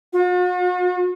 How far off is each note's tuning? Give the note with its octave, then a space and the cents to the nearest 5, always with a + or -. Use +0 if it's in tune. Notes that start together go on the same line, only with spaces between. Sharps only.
F#4 -45